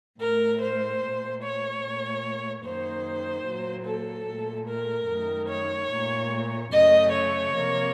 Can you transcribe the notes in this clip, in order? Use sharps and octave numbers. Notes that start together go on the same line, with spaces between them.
A2 A3 A#4
C5
A#2 A3
C#5
A#2 A3
F#2 D#3 A#3 C5
A#2 F#3 A#3
A4
A#2 A3
A#4
F#2 D#3 A3
C#5
A#2 A3
F#2 C#3 A3 D#5
C#5
C3 F3 A#3